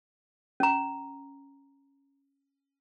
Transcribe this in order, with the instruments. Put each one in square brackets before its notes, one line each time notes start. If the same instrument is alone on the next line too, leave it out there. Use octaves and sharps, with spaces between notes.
[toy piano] C#4 A#5